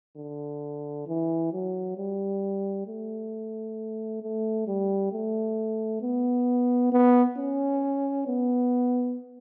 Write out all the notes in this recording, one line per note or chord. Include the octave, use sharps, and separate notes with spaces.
D3
E3
F#3
G3
A3
A3
G3
A3
B3
B3
C#4
B3